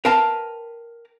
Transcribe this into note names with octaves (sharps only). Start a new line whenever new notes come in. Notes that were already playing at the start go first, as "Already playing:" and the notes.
A#4 B4 F5 G5 A5